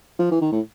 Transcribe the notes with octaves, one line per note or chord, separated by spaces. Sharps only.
F3
E3
D#3
A2